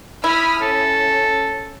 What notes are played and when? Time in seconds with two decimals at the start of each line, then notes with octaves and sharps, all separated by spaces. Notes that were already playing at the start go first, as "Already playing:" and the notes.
0.24 E4 B5 D#6 F6
0.61 C#4 A4